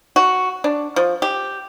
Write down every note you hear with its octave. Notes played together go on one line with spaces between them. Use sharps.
F#4
D4
F3
G4